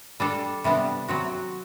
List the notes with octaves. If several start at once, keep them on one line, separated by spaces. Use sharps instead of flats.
G3 D4 A4
C3 G3 B3 D4
F#3 C4 F#4